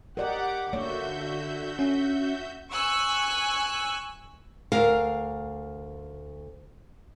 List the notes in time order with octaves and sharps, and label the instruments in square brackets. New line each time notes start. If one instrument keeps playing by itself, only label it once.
[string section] G4 F#5 D6 [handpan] A#4 D5 D#5
[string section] D3 [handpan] A#3 C#5 D5 [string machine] F#4 E5 G6
[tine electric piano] C#4
[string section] G#5 C#6 E6 F#6
[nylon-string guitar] D2 A#4 F5